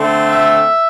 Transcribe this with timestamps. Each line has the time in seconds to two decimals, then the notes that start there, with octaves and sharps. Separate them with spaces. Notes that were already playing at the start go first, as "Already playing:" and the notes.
Already playing: D3 A3 C4
0.28 E5